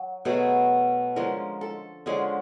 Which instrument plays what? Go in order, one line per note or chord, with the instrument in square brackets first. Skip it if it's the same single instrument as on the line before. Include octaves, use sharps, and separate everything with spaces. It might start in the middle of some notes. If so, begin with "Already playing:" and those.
Already playing: [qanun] F#3
B2 F#3 A3 G#4
D3 F3 G#3 C#4 A#4
A4
D3 F3 G#3 C#4 G#4